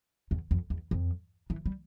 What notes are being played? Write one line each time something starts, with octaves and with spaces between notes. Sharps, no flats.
E2
F2
E2
F2
E3
G3